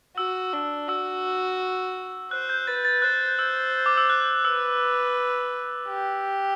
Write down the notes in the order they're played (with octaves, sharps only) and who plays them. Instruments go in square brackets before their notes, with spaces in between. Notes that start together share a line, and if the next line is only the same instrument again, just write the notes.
[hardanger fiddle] F#4 [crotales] E6
[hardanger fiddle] D4
[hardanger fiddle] F#4 [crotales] E6
[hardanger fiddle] C5 [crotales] F#6
[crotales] G6
[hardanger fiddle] B4 [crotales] A6
[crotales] A6
[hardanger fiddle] C5 [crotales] F#6
[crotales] E6
D6
E6
F#6
[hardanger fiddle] B4 [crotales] E6
[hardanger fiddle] G4